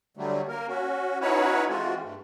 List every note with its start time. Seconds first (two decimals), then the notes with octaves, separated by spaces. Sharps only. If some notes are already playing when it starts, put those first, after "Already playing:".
0.17 D3 F#3 G3 A3
0.48 A#3 A#4
0.68 C#4 F#4
1.21 C#4 D#4 E4 F#4 B4 C#5
1.69 E3 G#3 A3 C4 F4 F#4
2.03 G2 A3